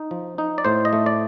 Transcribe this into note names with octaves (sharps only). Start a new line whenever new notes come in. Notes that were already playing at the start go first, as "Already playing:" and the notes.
Already playing: D#4
F3
D#4
D5
A2 C5
D#5
A3
D5